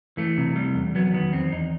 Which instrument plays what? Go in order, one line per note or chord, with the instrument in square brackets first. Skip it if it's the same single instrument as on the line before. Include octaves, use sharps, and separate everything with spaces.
[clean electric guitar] E3 A3
C3
G3
E2
F#3 B3
D#3 B3
E2 C4
E2 D#4